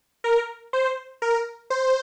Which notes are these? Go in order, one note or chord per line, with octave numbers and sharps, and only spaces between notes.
A#4
C5
A#4
C5